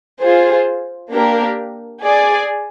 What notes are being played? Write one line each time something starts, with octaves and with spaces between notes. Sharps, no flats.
F4 G#4 C5
A#3 D4 G4 A#4
G#4 D5 G#5